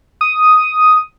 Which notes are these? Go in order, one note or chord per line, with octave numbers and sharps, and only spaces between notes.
D#6